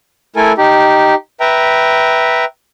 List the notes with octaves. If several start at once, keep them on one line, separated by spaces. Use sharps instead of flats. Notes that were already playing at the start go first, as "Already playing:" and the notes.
A3 E4 A4 A#4 G#5
D#4 G4
B4 E5 G5 A#5